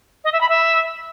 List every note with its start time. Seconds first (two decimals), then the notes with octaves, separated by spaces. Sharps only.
0.24 D#5
0.32 E5
0.41 B5
0.49 E5